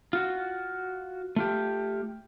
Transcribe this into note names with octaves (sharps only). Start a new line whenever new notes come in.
F4 F#4
A3 F4 G4